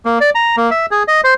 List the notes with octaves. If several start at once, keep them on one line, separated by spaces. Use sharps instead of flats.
A#3
D5
A#5
A#3
E5
G#4
D#5
C5